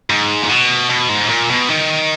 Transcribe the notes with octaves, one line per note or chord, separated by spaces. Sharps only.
G#2
A#2
B2
B2
G#2
A#2
B2
D#3